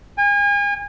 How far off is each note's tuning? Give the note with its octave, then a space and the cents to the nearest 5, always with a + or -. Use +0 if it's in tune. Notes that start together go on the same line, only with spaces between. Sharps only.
G#5 -40